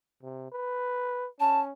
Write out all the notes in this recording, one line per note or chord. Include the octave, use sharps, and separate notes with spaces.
C3
B4
C#4 A5